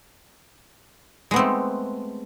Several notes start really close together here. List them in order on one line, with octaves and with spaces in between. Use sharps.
G#3 B3 C4 A3